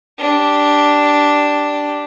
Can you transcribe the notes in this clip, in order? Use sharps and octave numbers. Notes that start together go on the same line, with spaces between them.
D4 G4